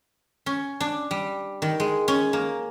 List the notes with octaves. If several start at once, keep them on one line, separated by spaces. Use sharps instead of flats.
C#4
D4
G3
D#3
G#3
C#4
A#3